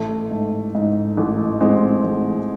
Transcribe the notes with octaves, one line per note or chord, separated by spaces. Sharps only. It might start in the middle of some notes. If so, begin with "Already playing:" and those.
Already playing: A1 A3
G#2
G#2
A1
A1 G#3 C4
A1